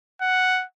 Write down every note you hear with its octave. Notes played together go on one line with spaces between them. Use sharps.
F#5